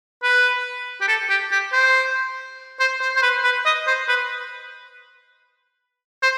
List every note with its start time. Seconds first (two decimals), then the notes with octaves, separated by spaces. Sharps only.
0.23 B4
1.01 G4
1.08 A4
1.30 G4
1.52 G4
1.73 C5
2.80 C5
3.01 C5
3.16 C5
3.23 B4
3.44 B4
3.66 D#5
3.87 C5
4.08 B4
6.23 C5